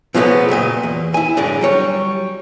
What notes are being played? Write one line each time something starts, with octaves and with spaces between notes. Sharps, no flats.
B2 F3 F#3 G#3 A3 B3
C#2 F#2 A#2 D#5
E2
E4 G#5
F#2 A2 D3 G#3
F#3 G3 C#5